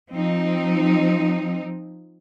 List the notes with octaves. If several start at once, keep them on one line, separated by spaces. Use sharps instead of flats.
F3 C4 D#4